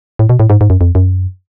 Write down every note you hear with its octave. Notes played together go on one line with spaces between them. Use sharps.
A2
B2
A2
G#2
G#2
F#2
F2
F#2